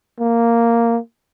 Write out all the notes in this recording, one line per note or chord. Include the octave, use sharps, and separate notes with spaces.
A#3